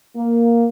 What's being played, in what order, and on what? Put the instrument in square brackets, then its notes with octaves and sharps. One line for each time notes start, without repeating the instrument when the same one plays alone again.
[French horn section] A#3